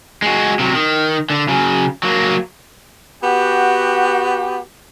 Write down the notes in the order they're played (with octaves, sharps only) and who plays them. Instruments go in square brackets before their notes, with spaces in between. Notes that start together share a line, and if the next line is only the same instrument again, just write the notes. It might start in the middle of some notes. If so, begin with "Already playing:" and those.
[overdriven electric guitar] G#3 F#4
C3 F#3
D#3
D3
C#3 F#3
F#3 A#3
[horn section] B3 F#4 G4